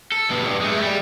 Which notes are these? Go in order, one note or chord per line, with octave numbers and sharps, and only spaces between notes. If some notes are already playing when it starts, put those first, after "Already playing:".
A4
G2 B2
G2
G#3 A3
G3